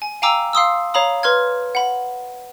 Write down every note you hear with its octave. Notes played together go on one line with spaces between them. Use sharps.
G#5
F5 G5 G#5 A#5 D6 E6
F5 C6 D#6 E6
C#5 F5 A#5 B5 D#6
B4 C6 F6 G#6
F#5 B5